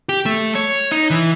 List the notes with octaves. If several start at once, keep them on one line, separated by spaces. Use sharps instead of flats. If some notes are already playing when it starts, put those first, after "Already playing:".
G4
A3
C#5
D#4
E3